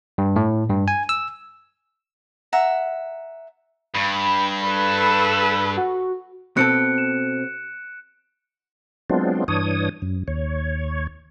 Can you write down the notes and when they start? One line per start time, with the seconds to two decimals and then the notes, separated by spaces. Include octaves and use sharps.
0.18 G2
0.36 A2
0.69 G2
0.88 G#5
1.09 E6
2.53 E5 F#5 A#5
3.95 G2 B5
4.65 A4 B4
5.77 F#4
6.57 B2 C4 A4 F#6 C#7 D7
6.98 E7
9.10 F#3 G#3 B3 C4 D4 F4
9.48 G2 E3 D4 C#5 D#6
10.02 F#2
10.28 D#2 C#5